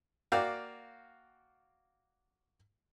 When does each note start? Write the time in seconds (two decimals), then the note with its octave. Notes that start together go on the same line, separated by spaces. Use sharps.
0.32 A#3 F#4 D5 F5 G5